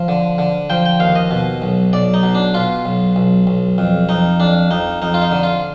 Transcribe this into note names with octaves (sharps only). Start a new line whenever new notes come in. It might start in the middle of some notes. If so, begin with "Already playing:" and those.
Already playing: F3
D3
D3
F3 G5
G5
D#2 F5
D#5
B2
B1
B1 D5
D#4
B2
D4
B2 F4
B1
B1
B1
F2
F2 D#4
F2 D4
F2 D#4
F2 D#4
F4
D#4
D3
F4